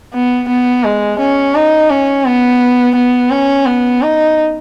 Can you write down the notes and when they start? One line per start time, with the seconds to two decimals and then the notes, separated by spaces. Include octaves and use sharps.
0.14 B3
0.49 B3
0.84 G#3
1.20 C#4
1.55 D#4
1.90 C#4
2.25 B3
2.95 B3
3.31 C#4
3.66 B3
4.02 D#4